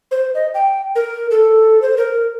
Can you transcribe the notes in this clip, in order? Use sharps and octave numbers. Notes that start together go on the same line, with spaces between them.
C5
D#5
G5
A#4
A4
C5
A#4